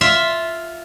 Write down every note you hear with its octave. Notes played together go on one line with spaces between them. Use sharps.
F4 E5